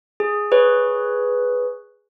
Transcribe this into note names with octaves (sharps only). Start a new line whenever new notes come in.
G#4
G#4 B4 C#5